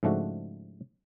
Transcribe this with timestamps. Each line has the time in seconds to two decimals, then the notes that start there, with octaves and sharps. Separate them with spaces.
0.03 G#2 C#3 F3 A3 D4 F#4